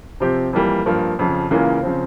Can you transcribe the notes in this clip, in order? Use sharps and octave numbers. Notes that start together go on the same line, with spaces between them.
C3 F3 C4 G4
F2 E3 G3 A#3
G2 F3 A#3
F2 C#3 F3
C#2 C#3 E3 A#3 F4
C#3 F3 C4